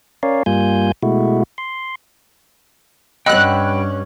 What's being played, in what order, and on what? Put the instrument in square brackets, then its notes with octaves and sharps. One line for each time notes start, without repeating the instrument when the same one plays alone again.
[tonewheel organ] C#4 A#4 C#5 D5 F5
G2 G3 A#3 F4 G#5 G6
B2 G#3 A3 E4 F#4
C6
[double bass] G2 C#4 [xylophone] D#5 [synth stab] F#5 F#6 [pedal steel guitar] G5 B5 E6